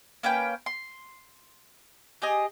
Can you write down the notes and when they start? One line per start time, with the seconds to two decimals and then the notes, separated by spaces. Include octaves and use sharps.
0.23 A#3 C#4 B4 G5
0.66 C6
2.22 G4 G#4 D#5